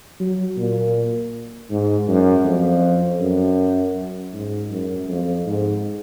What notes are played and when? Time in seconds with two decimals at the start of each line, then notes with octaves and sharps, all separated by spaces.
0.20 F#3
0.57 A#2
1.70 G#2
2.08 F#2
2.45 F2
3.20 F#2
4.33 G#2
4.70 F#2
5.08 F2
5.46 G#2